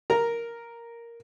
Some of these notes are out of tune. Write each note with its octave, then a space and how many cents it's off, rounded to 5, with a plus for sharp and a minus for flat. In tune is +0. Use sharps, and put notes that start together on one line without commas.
A#4 +0 A#5 +0